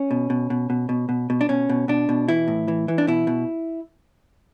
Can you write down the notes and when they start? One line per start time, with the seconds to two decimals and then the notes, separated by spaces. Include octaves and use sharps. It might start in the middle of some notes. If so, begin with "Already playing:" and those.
Already playing: C#4
0.11 B2
0.30 B2
0.50 B2
0.70 B2
0.89 B2
1.09 B2
1.30 B2
1.41 D4
1.49 B2 C#4
1.69 B2
1.88 B2 D4
2.09 B2
2.28 E3 E4
2.48 A2
2.68 E3
2.88 E3
2.98 D4
3.07 B2 E4
3.27 B2